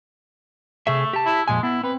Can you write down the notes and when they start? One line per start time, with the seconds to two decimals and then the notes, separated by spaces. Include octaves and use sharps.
0.87 C3 A3 G#4 E5
1.13 G4 A5
1.25 E4
1.48 F2 A#2 G#3 G#5
1.63 B3 E4
1.83 C4 B4